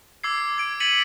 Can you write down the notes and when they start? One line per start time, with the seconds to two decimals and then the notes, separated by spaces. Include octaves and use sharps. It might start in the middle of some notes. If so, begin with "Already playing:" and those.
0.24 D6 E6 G#6 C7
0.58 G#6 D7
0.80 G#6 A6 B6 C#7 D#7 F#7